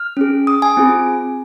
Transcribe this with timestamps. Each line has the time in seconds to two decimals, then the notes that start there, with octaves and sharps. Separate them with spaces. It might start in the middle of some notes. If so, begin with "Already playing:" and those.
Already playing: F6
0.17 C#4 G#4
0.47 D#6
0.62 G#5
0.77 C4 F4 G#4